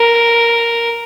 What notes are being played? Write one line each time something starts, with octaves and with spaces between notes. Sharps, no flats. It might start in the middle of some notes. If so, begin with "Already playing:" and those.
Already playing: A#4